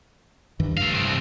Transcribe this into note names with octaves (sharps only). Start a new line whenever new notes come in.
G2 D#3 E3
A3 F5
C2 C3